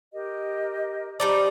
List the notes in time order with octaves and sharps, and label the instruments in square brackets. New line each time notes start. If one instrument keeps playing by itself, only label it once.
[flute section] G4 A#4 D#5
[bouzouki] G3 D#4 D5 [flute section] C5 A5